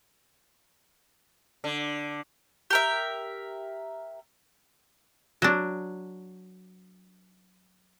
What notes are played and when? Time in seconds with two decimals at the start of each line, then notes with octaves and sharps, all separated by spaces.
1.64 D3
2.70 G4 A#4 E5
5.42 F#3 D4